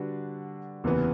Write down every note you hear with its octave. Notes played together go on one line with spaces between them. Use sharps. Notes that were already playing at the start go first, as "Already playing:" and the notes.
Already playing: D3 G3 D4 F#4 B4
F#1 E2 C3 E3 B3